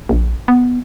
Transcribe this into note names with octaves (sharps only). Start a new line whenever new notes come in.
A#1
B3